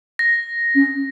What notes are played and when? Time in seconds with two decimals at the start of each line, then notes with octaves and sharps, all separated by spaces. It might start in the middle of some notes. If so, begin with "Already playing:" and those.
0.19 A#6
0.75 C#4